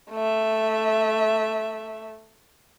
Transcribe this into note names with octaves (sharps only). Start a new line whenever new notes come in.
A3 E5